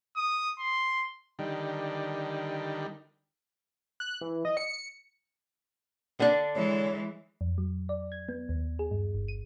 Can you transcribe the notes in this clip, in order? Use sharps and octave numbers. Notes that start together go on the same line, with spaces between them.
D#6
C6
D3 D#3 G3
F#6
E3
D#5
C#7
D3 D4
E3 G#3 C#5
F2
F#3
D5
G#6
B3
D#2
G#4
G2
G1
D#7